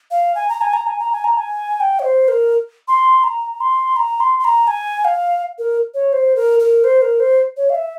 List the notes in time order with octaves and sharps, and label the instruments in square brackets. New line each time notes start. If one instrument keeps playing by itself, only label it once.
[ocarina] F5
G#5
A#5
G#5
A#5
G#5
A#5
G#5
A#5
G#5
G5
C#5
C5
A#4
C6
A#5
C6
A#5
C6
C6
A#5
G#5
F5
A#4
C#5
C5
A#4
A#4
C5
A#4
C5
C#5
F5
E5